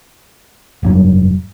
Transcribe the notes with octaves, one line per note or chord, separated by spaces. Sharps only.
F1 G2 F#3